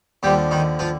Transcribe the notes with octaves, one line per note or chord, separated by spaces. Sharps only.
D#2 D3 F3 G3 G4
D#3 D#4
F3 F4